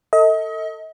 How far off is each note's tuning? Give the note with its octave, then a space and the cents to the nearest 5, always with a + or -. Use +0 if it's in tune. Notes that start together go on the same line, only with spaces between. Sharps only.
A4 +30 D#5 +35